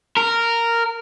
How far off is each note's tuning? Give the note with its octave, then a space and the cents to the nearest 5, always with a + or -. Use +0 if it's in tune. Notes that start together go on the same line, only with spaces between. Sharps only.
A#4 -10